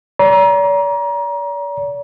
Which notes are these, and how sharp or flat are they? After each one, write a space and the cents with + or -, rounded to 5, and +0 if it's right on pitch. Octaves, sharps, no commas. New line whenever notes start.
D5 -45 A#5 +30